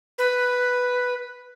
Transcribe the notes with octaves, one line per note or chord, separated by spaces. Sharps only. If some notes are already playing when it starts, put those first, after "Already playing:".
B4